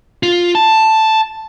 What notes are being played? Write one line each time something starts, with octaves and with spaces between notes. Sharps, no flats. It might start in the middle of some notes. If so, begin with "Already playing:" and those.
F4
A5